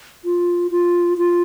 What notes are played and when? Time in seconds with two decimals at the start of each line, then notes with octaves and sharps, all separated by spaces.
0.25 F4
0.71 F4
1.18 F4